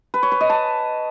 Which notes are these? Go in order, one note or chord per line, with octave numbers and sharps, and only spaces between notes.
B4
C#5
B4
D#5
A5